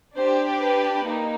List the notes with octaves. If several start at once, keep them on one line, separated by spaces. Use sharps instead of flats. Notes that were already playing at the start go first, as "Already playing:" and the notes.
D4 G4 C5
B4
A#3 D#4